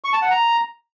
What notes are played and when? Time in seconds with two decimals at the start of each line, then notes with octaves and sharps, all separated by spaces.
0.04 C#6
0.13 A5
0.22 F#5
0.30 A#5